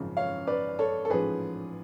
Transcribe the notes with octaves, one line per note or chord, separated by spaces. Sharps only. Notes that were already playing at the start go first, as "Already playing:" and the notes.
Already playing: G#1 F#2 C#3 F3
C#5 F5
B4 D5
A4 C#5
A4
A1 G#2 F3 G#4 B4